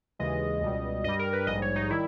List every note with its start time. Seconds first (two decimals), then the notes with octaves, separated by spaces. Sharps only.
0.19 D#2 C#3 E3 G#3 D#5
0.61 C#2 B2 G3
1.04 G2 G3 D#5
1.19 A#4
1.33 B4
1.47 A#1 G#2 G3 D#5
1.62 C#5
1.76 D#4
1.90 D#3 G3 E4